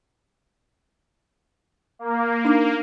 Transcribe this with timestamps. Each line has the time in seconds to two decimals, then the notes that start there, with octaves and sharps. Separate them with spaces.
1.99 A#3
2.45 D4 D#4 D6